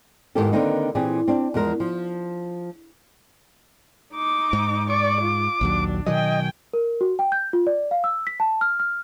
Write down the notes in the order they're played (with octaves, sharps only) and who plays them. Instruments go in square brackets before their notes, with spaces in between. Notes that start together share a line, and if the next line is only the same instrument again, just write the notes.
[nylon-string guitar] E2 G#2 D#3 B3 G4 A4
D3 D#3 A#3 C4 D#4 B4
A#2 E3 C4 G4 G#4
C4 D4
E2 F3 G#3 A#4
F3
[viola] D#4 D6
[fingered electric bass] G#2
[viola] D5 C#6 [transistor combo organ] D6
[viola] F4
[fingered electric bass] A#1 D#2 F#3 [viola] D4
[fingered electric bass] B2 D#3 F#3 [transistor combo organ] D#5 [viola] G5 G#5
[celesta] A#4
F#4
G5
G6
F4
D5
F5
E6
B6
A5
F6
F6